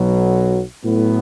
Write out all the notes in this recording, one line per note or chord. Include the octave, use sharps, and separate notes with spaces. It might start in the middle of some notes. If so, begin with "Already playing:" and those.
Already playing: B1 B2 F#3
A2 F#3 B3